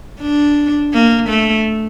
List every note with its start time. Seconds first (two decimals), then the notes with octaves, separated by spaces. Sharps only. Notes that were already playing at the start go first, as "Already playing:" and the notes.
0.22 D4
0.94 A#3
1.29 A3